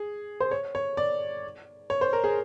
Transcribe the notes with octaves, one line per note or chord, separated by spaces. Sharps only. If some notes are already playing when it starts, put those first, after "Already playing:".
Already playing: G#4
C5
C#5
C#5
D5
C#5
C5
A#4
G#4